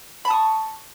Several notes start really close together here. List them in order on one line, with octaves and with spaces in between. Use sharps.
B5 A5 D#6 C#6